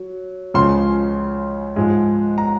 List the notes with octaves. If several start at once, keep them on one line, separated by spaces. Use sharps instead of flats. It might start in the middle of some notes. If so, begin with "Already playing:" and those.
Already playing: F#3
C#2 C#3 F3 G#3 C6
G#2 F3 G#3
A#5